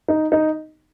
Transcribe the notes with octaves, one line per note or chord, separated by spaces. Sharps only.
D#4
D#4